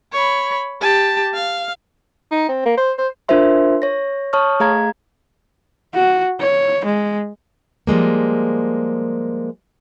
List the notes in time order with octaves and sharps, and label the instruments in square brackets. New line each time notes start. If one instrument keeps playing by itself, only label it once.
[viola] C#5 B5
G4 A5
F5
[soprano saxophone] D#4
C4
A#3
C5
C5
[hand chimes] D4 F4 A#4 C5 E5 C6
C#5 A#6
C#5 A5 C#6 D#6 F6
A3 G#4 F5 A#5 G#6
[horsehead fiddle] F#4
C#5
G#3
[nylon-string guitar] F3 G3 G#3 A#3